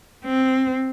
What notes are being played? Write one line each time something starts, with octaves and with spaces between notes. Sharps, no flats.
C4